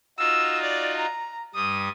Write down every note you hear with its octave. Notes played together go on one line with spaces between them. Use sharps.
D#4 F4 F#4 E6
D5
A#5
G2 G3 D#6